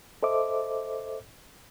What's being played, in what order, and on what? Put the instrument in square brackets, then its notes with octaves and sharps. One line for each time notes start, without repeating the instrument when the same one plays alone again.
[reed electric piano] A4 C5 D#5 E5 D6